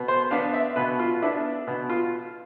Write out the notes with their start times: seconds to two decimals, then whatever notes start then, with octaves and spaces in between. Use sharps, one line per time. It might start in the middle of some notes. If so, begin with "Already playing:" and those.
Already playing: B2
0.08 C5
0.31 B3 D4 F5
0.54 E5
0.76 B2 B4
0.99 F4
1.22 B3 D4 E4
1.67 B2
1.90 F4